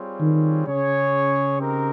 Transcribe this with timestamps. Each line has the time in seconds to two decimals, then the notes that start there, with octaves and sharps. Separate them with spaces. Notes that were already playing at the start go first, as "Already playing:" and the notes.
Already playing: G3 C4 F4 G#4 C#5
0.21 D#3
0.67 C#3 C#4 G#4 C#5
1.59 C4 D#4 G4 A#4